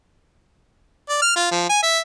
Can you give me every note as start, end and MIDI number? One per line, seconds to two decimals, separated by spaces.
1.09 1.18 74
1.22 1.34 89
1.36 1.51 65
1.52 1.67 53
1.69 1.82 80
1.83 1.99 76